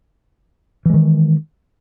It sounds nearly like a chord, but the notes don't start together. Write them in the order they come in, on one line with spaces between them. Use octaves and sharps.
E3 G#3 D#3